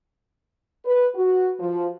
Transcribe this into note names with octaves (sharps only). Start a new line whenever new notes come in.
B4
F#4
F3